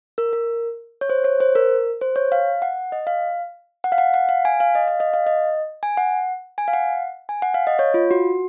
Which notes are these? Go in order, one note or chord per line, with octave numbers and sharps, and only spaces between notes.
A#4
A#4
C#5
C5
C#5
C5
A#4
C5
C#5
F5
F#5
D#5
F5
F#5
F5
F#5
F#5
F5
G#5
F5
D#5
F5
D#5
F5
D#5
G#5
F#5
G#5
F5
F#5
G#5
F#5
F5
D#5
C#5
F4
F#4